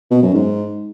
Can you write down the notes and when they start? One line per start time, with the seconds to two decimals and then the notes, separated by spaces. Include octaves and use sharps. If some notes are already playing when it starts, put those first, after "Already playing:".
0.11 B2
0.22 F#2
0.34 G#2